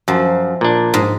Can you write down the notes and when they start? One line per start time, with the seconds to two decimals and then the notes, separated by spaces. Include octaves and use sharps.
0.08 F#2 F3
0.61 A#2 D4
0.94 G#2